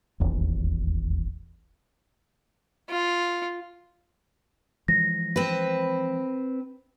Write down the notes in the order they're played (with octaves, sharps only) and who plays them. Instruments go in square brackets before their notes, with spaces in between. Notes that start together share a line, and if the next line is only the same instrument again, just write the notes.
[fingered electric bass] D#1 G#1 E2
[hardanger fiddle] F4
[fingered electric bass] E3 F3 G#3 [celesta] A#6
[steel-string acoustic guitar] C4 B4